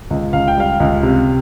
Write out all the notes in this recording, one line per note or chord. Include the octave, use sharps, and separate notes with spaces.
C#2
C#2 F5
G5
G3 F5
C#2
C3